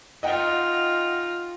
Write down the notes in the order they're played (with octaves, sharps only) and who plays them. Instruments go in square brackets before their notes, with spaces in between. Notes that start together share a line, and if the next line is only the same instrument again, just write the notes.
[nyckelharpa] D#4 F4 [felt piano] D#5 F#5 G5